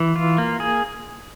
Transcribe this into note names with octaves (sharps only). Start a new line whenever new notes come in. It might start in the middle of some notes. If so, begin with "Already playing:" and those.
Already playing: E3
F4
A#3
G#4